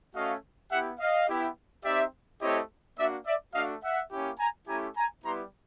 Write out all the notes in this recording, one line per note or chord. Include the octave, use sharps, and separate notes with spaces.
A3 C#4 F#4 D#5 F5
B3 E4 G4 E5 F#5
D#5 F5
B3 E4 G4
C4 D#4 G4 D5 E5
A3 C4 E4 G4 C#5 D#5
A#3 D4 F#4 D5 E5
D5 E5
A3 D4 F#4 D#5 F5
E5 F#5
A#3 C#4 E4 G4
G#5 A#5
A3 C#4 E4 G4 G#5 A#5
G#5 A#5
G3 B3 E4 G4 A#5 C6